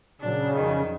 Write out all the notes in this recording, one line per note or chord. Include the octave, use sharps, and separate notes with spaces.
A#2 C#3 F#3 D4
F2 D#3 F#3